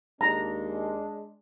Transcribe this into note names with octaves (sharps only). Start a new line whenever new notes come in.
D#2 G#3 D4 A#5